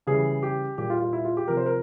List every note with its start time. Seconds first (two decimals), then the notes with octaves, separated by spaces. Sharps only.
0.07 C#3 E3 G3 G#4
0.43 G4
0.78 A#2 G3 G4
0.90 F4
1.01 F4
1.13 E4
1.25 F4
1.37 G4
1.48 C3 F3 A#4
1.57 C5
1.66 A#4